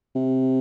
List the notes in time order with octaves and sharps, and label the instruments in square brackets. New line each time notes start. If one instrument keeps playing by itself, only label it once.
[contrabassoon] C3